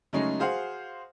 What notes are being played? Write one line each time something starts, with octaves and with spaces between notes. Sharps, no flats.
C#3 F#3 G#3 A3 C#4 D#4
F#4 G#4 C5 F5 F#5